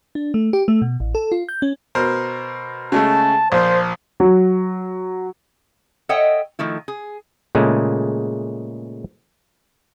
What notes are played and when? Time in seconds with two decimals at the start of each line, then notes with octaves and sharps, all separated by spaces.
0.15 D4
0.34 A3
0.53 G4
0.68 A3
0.82 B2
1.00 A1
1.15 A4
1.32 F4
1.49 G6
1.62 C#4
1.95 B2 A#4 C5
2.92 C#3 G#3 A3 A5
3.52 A#1 F3 C5
4.20 F#3
6.09 A4 C#5 D#5 E5 F#5 G5
6.59 D#3 F3 A3 E4
6.88 G#4
7.55 A#2 C#3 G#3 A3